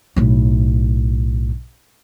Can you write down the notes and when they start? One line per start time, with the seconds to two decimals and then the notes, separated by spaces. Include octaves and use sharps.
0.16 B1 A2